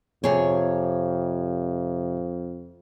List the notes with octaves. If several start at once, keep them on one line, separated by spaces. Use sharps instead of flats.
F2 C3 G#4 C#5